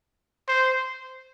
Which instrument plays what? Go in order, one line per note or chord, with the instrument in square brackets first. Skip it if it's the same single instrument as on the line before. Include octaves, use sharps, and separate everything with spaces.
[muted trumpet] C5